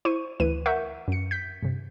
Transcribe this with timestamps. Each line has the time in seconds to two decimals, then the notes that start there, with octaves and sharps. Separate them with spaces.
0.05 E4 C5 C#6 D#7
0.40 D2 E3 E4 B4 D#7
0.66 A#4 E5 F#5 C#6 G6
1.08 F#2 C#7
1.31 G6 B6
1.63 G2 C3